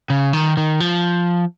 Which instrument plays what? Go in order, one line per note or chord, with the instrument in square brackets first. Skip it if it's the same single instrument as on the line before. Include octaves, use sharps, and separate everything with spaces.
[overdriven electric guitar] C#3
D#3
D#3
F3